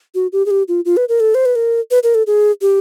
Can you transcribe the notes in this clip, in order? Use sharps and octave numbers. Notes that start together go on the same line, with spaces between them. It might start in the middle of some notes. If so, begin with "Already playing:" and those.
F#4
G4
G#4
G4
F4
F4
B4
A#4
A4
C5
B4
A#4
B4
A#4
A4
G#4
G4